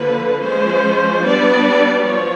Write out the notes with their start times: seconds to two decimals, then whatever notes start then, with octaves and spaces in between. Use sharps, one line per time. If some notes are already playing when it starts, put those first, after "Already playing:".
Already playing: D3 F3 A#3 B4
0.41 F3 G#3 C#4 C5
1.23 G3 B3 D4 D5
2.05 F3 C#5